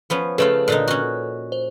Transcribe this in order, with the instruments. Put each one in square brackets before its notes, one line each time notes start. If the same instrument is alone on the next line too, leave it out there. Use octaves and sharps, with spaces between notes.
[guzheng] F3 B3 C#4
[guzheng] C#3 A3 F4 [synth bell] A4 B4
[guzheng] A#2 D3 D#4
C#4 F#4
[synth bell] C5